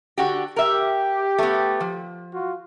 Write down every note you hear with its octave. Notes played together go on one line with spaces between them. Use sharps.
D3 F#4 G4
G4 A#4 E5
A3 B3
F3
F4 F#4